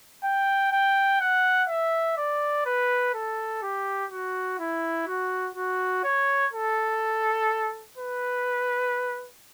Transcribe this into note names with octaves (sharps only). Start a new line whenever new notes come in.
G5
G5
F#5
E5
D5
B4
A4
G4
F#4
E4
F#4
F#4
C#5
A4
B4